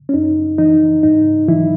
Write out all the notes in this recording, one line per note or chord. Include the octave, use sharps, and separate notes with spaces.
C#4
F#2 D#4
E3 D#4
G#2 D#4
D#3 E3 F#3 E4